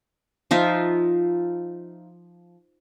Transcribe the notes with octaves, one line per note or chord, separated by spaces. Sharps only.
F3 D#4 F4 E5